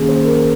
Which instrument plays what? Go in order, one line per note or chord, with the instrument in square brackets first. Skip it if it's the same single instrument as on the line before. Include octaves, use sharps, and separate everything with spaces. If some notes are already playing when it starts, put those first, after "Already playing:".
Already playing: [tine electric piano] D#3 A#3 C#4 G#4
C5
A#4